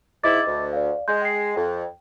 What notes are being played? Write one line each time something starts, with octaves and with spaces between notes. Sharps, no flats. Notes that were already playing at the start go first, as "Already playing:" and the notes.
G#2 E4 D#5 D6 A6
D2
D5 F5
G#3 C6 G6
G5 C7
F2 G5